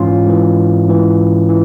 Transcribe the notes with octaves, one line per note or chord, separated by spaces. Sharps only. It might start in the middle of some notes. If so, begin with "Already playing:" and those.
Already playing: G#2 E3 C#4 F4
G#2 E3
G#2 E3
E3